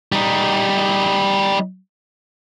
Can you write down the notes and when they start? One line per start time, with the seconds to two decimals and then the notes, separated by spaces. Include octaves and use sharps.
0.12 G3 D#4